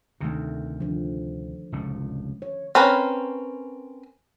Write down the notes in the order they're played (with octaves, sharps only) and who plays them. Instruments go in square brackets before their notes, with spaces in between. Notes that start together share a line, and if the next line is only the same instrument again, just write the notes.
[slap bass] D2 C3 [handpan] D#3 A3
[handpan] D3 F3
[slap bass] F1 C#2 A2
[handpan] C#5
[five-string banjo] C4 C#4 A#4 B4